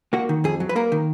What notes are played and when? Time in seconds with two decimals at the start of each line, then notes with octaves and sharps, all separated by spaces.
0.13 A#3 F#4
0.29 D#3
0.44 F2 G#4
0.60 F#3
0.69 B4
0.76 A#3 A#4
0.92 D#3